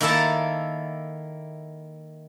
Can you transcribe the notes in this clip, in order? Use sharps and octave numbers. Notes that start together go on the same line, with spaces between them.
D#3 A#3 E4 A4 A5